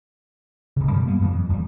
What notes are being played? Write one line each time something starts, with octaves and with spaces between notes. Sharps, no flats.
D1 C#3
F#2 B2 D#3 F3
G3 A#3 B3
F#2 A2 D#3 E3
F2
D#1 E2 F3 G3